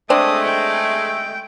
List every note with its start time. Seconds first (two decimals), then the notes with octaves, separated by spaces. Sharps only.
0.10 G#3 A3 C4 D4 D#6
0.44 G5